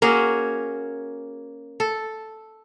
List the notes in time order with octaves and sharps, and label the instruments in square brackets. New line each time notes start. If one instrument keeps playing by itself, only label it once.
[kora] A#3 C#4 F#4 G#4
A4